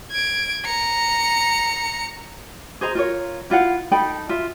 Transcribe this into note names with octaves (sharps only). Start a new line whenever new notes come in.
G#6 D7
A#5 C#7
G#4 C5 D#5 A#5
F4 A#4 C#5
E4 F4 F5 F#5
D#4 A4 G5 B5
F4 E5